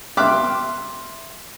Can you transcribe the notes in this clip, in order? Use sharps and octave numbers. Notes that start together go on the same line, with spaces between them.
E5 G5 C6 D6 F6 F#6